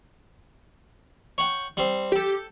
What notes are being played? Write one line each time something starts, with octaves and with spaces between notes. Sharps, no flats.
C#5 F#5 G5
G3 C4
G4 A4 G5